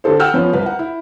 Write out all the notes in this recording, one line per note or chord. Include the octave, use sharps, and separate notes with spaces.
D3 G4 A4 C5
F#5 G5 E6 F6 G6
F3 B3 C#4
C2 B4
F#5
E4